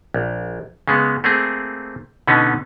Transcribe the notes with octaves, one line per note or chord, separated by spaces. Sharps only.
A#1
C#3 G#3 B3
A3 A#3 C4 G#4
B2 D3 B3 C#4 D#4